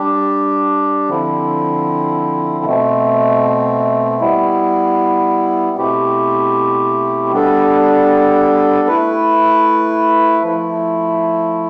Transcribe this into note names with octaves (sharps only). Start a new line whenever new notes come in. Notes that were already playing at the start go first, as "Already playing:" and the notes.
Already playing: G3 D4 G4
D3 F3 C4 E4
B2 A3 C4
G3 B3 E4
B2 A3 C4 E4 G4
G3 B3 D4 A4
A3 E4 B4
F3 A3 E4